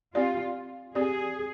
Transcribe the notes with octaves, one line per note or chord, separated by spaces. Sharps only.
C4 F4 G4 D5
C4 G4 G#4 D5